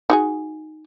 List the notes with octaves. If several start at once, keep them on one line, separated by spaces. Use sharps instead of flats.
D#4 F#4 G#4